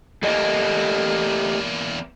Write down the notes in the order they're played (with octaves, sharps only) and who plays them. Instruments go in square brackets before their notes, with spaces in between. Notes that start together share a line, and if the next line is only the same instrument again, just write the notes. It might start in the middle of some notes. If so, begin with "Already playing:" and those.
[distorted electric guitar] E2 A#3 [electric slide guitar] A3 G4 D#5